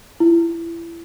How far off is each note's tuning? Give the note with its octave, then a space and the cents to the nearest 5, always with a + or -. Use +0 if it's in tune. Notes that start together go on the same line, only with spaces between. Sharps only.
E4 +25